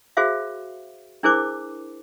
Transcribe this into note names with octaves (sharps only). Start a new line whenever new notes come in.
F#4 G#4 C5 E5 F5
D4 E4 G#4 A#4 C5 D6